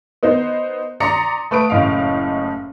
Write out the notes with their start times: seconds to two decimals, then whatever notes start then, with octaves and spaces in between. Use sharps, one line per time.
0.23 B3 D#4 C5
1.00 D5 A#5 C6 D#6 C#7
1.51 A3 B4 D#6 D7
1.70 F#1 A2 D#5 F5